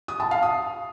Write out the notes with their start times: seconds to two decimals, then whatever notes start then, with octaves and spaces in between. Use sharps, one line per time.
0.08 D#6
0.20 A5
0.31 F5
0.43 D#6